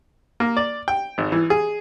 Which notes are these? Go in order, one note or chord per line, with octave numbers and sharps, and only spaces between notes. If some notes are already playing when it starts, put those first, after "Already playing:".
A#3
D5
G5
G#1
E3
G#4